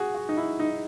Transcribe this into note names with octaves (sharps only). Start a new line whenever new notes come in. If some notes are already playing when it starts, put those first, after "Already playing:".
Already playing: F#4 G#4
F#4
D#4
E4
D#4